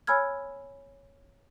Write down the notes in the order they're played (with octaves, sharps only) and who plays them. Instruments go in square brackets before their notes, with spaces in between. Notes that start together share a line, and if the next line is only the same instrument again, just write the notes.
[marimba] C#5 G#5 B5 E6 F6 G#6